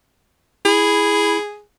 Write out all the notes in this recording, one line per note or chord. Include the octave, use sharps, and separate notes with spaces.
E4 G#4 B5